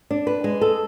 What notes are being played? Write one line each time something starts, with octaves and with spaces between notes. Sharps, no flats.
D4
B4
G#3
A4